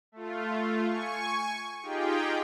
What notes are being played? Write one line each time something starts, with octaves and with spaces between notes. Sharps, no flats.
A3 F4
G#5 C#6
D#4 F4 G4 G#4 G5